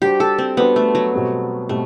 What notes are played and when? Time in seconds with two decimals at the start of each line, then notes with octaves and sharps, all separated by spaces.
0.02 G3 D4 F#4 G4 C5
0.20 A4
0.38 C4
0.57 G3 B3 D4 F#4 C5
0.76 A3
0.95 F#3
1.13 B2 G3 C4
1.69 B2 G3 A3 C4